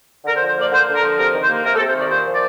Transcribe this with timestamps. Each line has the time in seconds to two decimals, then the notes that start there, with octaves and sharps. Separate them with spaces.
0.24 D3 A#4
0.37 C5
0.41 F3
0.48 C5
0.55 A#3 D5
0.71 D3 C5
0.87 D3
0.95 A#4
1.01 F3
1.17 C3 A#4
1.33 D#3
1.40 C5
1.49 A#3
1.64 C3 A#4
1.76 A4
1.80 C3
1.87 C5
1.95 D#3 D5
2.10 A#2 C5
2.25 F3
2.33 D5